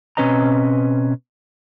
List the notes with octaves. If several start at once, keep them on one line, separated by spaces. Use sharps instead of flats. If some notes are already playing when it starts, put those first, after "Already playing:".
B2 C4 C#4 B4 D#5 A#5